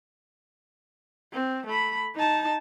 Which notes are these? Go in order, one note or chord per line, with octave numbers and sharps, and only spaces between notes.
C4
A3 B5
D#4 A5